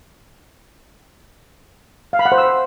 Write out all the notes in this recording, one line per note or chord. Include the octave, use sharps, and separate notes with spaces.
F5
B5
F#5
C5
E6